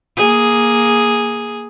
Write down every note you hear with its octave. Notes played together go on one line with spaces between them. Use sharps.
A#3 G#4